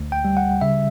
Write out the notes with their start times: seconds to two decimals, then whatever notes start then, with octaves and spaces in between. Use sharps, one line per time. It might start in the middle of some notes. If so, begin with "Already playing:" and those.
Already playing: D2
0.12 G5
0.25 G3
0.37 F#5
0.61 C#3 E5